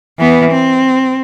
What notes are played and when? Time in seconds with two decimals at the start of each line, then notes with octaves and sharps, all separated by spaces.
0.19 E3 B3
0.51 C4